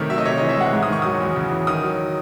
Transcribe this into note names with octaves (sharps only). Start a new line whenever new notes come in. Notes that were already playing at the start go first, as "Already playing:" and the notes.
Already playing: C3 D#3 A3 C#5
F#3 E5
D#5
C3 C#5
E3 D#5
E5
G#3 F#5
G#2
D#6
D#3 C#6
F#3 D#6
E2
C#3
E3
D#3 D#6
F#3